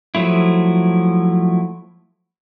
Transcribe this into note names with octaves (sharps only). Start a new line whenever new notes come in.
F3 F#3 A3 E4